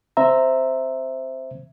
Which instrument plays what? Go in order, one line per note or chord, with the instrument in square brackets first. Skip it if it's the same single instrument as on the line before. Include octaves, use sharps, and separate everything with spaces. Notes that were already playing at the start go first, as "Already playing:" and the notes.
[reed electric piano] C4 C5 E5 A#5